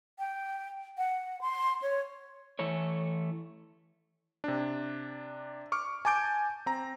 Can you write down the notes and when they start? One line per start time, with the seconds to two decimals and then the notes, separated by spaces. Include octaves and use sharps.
0.19 G5
0.98 F#5
1.41 C6
1.82 C#5
2.59 E3 A3 A4 C#5
4.44 C3 D4
5.72 C#6 D6 F6
6.05 G#5 A5 D6 G6 D7
6.66 C4 A#5